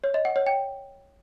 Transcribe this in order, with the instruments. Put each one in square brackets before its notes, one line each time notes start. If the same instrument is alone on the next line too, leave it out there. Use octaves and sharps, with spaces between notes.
[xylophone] C#5
D#5
F#5
C#5
G5